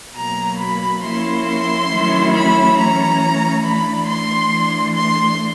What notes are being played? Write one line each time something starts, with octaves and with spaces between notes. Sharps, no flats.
B2 F#3 A#3 A#5
B5
F3 A#3 C#4 E4 C6
C6
D#3 F#3 A3 C#4 E4
B5
E3 A3 C#4 A#5
E3 A3 D4 B5
C6
E3 A3 D4
C6